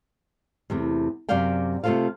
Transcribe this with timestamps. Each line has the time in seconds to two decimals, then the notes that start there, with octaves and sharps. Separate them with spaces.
0.70 E2 C3 A3
1.29 F#2 C3 F#4 D5 F5 G5
1.84 C3 A3 F4 A4 C5 F5